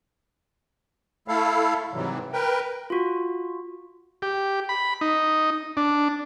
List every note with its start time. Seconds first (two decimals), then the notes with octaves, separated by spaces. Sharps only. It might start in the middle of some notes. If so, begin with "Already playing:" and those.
1.28 A3 E4 A4 F5
1.93 G#2 C3 E3 F#3 G3
2.33 A#4 B4 G5
2.90 F4 F#4
4.22 G4
4.69 B5
5.01 D#4
5.77 D4